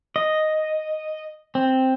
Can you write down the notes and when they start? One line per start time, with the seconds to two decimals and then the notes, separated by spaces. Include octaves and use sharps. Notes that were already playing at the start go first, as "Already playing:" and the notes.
0.16 D#5
1.55 C4